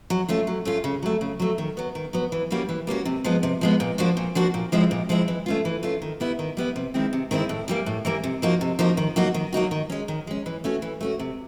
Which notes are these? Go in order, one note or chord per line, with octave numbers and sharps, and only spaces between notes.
F#3
A3 C#4 F4
F#3
A3 C#4 F4
C#3
F#3 A3
C#3
F#3 A3
D#3
F#3 B3
D#3
F#3 B3
E3
G3 A#3 C#4 F#4
E3
G3 A#3 C#4 F#4
C3
F3 G#3 B3
C3
F3 G#3 B3
A#2
F3 A#3 D4 F#4
A#2
F3 A#3 D4 F#4
A#2
F3 G#3 C4 E4
A#2
F3 G#3 C4 E4
E3
A3 C#4 F4
E3
A3 C#4 F4
D#3
G3 B3 E4
D#3
G3 B3 E4
C3
D#3 G#3 C4 E4
C3
D#3 G#3 C4 E4
A2
E3 G3 A#3
A2
E3 G3 A#3
C3
F3 A#3 D#4 F#4
C3
F3 A#3 D#4 F#4
D#3
F#3 A#3 D#4 F#4
D#3
F#3 A#3 D#4 F#4
D#3
G#3 C#4
D#3
G#3 C#4
E3
A3 C#4 F#4
E3
A3 C#4 F#4
C3